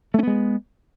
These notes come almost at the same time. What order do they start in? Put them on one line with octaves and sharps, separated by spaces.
A3 C#4 B3 G#3